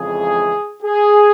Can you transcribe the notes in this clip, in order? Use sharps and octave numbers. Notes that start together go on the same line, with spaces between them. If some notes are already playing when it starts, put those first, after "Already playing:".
Already playing: F2 C#3 E3 G#3 G#4
G#4